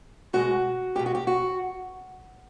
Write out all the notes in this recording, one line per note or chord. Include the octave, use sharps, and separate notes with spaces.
B2 G#3 F#4
B2 G#3 G4
F#4
G4
F#4